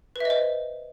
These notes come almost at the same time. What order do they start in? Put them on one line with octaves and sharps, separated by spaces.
B4 E5 D#5 C5